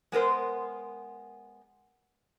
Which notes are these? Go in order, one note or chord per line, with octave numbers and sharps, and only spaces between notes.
G#3 B3 A#4 C5